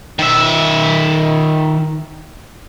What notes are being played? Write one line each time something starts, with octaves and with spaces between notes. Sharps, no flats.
D#3 E5